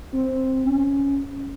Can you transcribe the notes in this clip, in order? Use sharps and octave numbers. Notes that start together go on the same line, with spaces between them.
C4
C#4